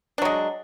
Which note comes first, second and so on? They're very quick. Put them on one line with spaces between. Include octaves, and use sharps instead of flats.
D4 F#3 G#3